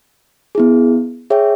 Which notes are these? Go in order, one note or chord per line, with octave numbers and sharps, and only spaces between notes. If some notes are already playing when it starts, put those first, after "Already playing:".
B3 E4 G#4
G#4 C#5 E5 G5